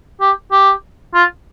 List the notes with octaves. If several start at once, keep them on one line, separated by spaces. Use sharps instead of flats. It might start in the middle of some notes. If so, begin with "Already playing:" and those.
G4
G4
F4